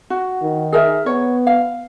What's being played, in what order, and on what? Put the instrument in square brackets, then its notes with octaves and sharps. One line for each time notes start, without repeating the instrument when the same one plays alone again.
[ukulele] F#4
[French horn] D#3
[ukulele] G#4 A#4 E5
[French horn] B3 [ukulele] C#5
[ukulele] F5